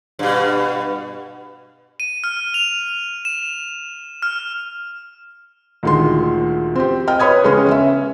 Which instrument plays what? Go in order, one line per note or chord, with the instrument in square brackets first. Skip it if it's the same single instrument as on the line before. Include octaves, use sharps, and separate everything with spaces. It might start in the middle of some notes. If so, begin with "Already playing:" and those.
[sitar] G2 B2
[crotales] D#7
F6
F7
E7
F6
[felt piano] D2 A#2 D#3 G#3 C6
C4 G4
D#5 G5 F6
B4 C#5 B5 D#6 G#6
C#3 G#3 B3 C#4
C#4 E5